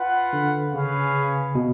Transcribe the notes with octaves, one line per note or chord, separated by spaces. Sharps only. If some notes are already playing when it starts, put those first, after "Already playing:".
Already playing: F4 B4 F#5
D3
C#3 C#4 G#4 B4 F5
B2